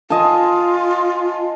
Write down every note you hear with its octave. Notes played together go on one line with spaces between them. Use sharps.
F4 D#5 G#5 A5